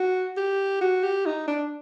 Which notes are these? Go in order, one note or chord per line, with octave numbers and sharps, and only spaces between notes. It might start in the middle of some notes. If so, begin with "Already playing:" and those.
Already playing: F#4
G4
F#4
G4
D#4
D4